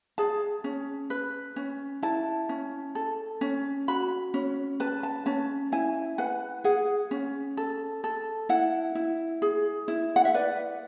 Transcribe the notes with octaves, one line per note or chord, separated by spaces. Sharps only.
G#4 A5
C#4
B4
C#4
E4 A5
C#4
A4
C#4
F#4 B5
C#4
B4 A5
A5
C#4 A5
E4 G#5
B4 F#5
G#4 F#5
C#4
A4
A4
E4 F#5
E4
G#4
E4
F#5
E5
B4 D5